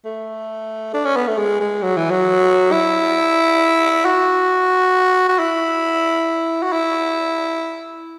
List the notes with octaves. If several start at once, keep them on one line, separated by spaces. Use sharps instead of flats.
A3
D4
C#4
B3
A3
G#3
G#3
F#3
E3
F#3
E4
F#4
F#4
E4
F#4
E4